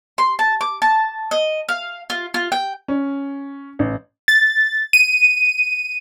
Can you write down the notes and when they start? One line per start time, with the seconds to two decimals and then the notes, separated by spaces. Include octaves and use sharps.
0.18 C6
0.39 A5
0.61 D6
0.82 A5
1.31 D#5
1.69 F5
2.10 F4
2.34 F4
2.52 G5
2.88 C#4
3.79 A1
4.28 A6
4.93 D#7